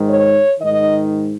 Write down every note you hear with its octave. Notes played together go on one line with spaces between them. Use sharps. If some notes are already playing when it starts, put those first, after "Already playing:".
Already playing: G#2 D#3
C#5
G#2 D#3 D#5